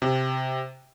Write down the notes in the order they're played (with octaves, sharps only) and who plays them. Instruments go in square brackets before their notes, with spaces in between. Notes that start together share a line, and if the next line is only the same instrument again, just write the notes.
[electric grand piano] C3